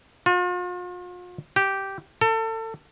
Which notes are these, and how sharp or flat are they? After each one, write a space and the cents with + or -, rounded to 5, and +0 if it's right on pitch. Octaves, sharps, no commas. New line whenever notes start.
F4 +40
G4 -10
A4 +30